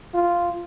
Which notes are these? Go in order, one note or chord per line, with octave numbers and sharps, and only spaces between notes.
F4